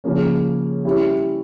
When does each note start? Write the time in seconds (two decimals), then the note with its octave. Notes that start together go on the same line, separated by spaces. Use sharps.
0.04 C#3 F3 A#3 C#4
0.84 G3 C#4 E4 G4